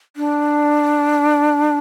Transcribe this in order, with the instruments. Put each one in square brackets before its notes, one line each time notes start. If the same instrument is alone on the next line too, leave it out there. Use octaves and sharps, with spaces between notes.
[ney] D4